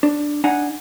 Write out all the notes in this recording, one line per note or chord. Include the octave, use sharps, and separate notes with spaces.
D4
D4 D#4 F#5 G#5